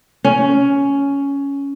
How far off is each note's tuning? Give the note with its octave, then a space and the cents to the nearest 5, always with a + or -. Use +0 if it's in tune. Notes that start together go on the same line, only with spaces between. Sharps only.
C#4 +10